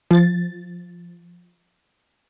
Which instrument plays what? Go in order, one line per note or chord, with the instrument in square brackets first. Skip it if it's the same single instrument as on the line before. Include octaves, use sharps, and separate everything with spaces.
[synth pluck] F3 A6